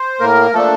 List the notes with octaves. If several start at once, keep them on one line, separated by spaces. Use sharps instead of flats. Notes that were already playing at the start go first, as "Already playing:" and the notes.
Already playing: C5
A2 A#3 A#4
F3 A3 A#3 D4 A4